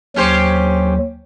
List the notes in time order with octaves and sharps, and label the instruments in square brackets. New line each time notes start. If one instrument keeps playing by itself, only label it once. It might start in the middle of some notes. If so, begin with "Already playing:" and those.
[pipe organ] D#2 F#3 [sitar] C#4 G4 C5